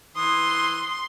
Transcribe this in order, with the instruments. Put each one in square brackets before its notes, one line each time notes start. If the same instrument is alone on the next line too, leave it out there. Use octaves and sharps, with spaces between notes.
[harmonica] E3 D#6 [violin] C6